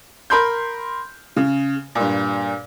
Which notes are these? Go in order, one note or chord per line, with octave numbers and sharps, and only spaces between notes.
A#4 B5 C6 G6
C#3
G2 A#2